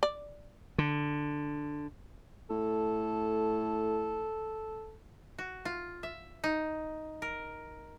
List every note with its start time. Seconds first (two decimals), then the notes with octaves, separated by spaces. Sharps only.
0.03 D5
0.78 D3
2.50 A2 A4
5.38 F#4
5.65 F4
6.03 E5
6.44 D#4
7.22 A#4